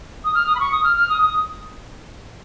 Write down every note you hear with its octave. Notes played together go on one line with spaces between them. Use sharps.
D#6
F6
D#6
B5
C#6
D#6
F6
F6
D#6
D#6